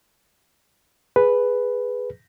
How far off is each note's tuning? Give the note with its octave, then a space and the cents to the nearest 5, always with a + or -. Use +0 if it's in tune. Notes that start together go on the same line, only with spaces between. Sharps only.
G#4 +0 B4 +0